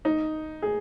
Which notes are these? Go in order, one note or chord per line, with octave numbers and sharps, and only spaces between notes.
D#4
G#4